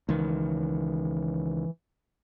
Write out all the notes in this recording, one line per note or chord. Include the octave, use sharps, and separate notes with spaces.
C#2 D#3 E3